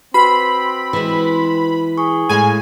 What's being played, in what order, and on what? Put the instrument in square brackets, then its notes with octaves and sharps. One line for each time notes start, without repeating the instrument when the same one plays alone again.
[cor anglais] C4 [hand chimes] F#4 B4 [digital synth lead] B5
[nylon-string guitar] E3 G#3
[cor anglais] G#4 [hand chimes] C#6
[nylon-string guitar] A2 G#3 F5 [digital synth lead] G#5